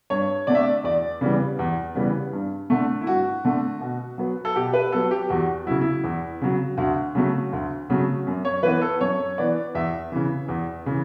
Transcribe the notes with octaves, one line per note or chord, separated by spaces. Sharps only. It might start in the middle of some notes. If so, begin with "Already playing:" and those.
G2 C#5
D3 A3 D5
E5
D5
E2 D5
C#3 E3 G3 B3
E2
C#3 E3 G3 B3
G2
D3 A3
E4
G2 F#4
D3 A3
B2
F#3 B3
A4
B2 G4
B4
F#3 B3 A4
G4
E2 F#4
C#3 F#3 E4
E4
E2
C#3 F#3
D2 F#4
C#3 F#3 A3
D2
C#3 F#3 A3
F#2
C#5
E3 B3 B4
A4
F#2 C#5
E3 B3 D5
E2 E5
C#3 E3
E2
C#3 E3